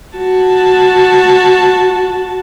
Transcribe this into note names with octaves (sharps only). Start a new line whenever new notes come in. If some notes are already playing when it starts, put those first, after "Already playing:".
F#4 A5